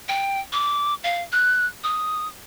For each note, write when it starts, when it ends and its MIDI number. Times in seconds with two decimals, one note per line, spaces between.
0.08 0.40 79
0.53 0.94 86
1.04 1.22 77
1.32 1.66 90
1.84 2.27 87